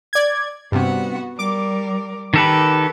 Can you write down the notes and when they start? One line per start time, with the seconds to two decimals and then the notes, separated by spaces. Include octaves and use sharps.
0.13 D5 G#6
0.72 G2 C3 B3 F#4 F#5
1.39 G3 A#4 D6
2.34 D#3 G4 A4 B4